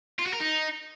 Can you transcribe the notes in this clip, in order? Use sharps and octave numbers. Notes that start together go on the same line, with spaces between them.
F4
F#4
A#4
D#4